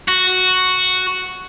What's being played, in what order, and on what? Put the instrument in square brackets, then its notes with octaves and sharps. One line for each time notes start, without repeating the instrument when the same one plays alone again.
[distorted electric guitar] F#4